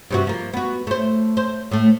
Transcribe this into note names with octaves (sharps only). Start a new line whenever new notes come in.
G2 C3 F#4
F3 A#3
B3 F#4
A3 C5
C5
A2 A3